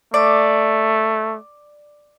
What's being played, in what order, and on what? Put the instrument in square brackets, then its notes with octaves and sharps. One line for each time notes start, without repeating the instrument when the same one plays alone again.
[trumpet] A3 [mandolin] D5